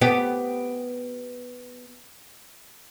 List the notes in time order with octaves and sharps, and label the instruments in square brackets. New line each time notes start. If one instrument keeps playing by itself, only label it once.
[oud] B3 G4